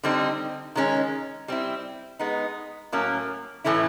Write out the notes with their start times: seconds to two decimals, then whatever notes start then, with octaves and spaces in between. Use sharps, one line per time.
0.03 D3 G3 C4 D#4
0.75 D#3 G#3 C#4
1.48 G3 C4 E4
2.19 G#3 B3 D#4
2.92 A2 F#3 A#3 C#4
3.64 A2 E3 A3 C#4 E4